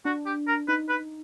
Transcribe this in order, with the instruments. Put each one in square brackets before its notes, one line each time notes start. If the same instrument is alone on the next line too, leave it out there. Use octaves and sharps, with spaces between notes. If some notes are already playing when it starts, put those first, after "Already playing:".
[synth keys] D4 [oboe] F#4
[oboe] G4
A#4
[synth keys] D#4 [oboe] B4
[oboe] B4